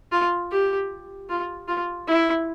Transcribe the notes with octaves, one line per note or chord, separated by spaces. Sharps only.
F4
G4
F4
F4
E4